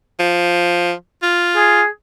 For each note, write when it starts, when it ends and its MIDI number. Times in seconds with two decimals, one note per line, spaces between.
0.19 0.93 53
1.23 1.81 65
1.56 1.86 68